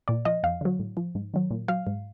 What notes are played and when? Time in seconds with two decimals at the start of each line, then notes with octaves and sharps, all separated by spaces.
0.08 A#2 D5
0.25 F3 D#5
0.43 F2 F5
0.61 D3 F#3
0.79 A2
0.97 F3
1.15 G#2
1.34 D#3 F#3
1.51 A#2
1.68 F#3 F5
1.87 G#2